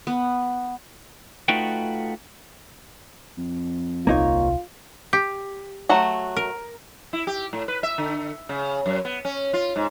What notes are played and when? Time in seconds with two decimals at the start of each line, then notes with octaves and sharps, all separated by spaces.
0.07 B3
1.48 A3 D#4 F4 F#4 B4 G5
3.38 F2
4.07 D#1 C2 A#3 D#4 F4 C#5
5.13 G4
5.89 F#3 A3 F#4
6.37 A#4
7.13 E4
7.27 G4
7.53 A2
7.68 B4
7.83 E5
7.98 D3
8.49 C#3
8.86 F#2
9.05 B3
9.25 C#4
9.54 F4
9.76 G#2